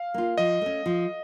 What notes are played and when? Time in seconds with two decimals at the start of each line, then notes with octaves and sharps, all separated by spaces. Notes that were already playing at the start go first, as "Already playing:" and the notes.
Already playing: F5
0.14 A#3 F4
0.38 F3 D#5
0.62 A3 C#4
0.86 F3